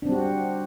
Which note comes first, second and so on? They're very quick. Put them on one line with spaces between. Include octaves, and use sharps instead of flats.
D4 C4 G3 F#4